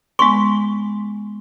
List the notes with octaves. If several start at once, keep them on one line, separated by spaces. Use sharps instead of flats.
G#3 B3 C6 C#6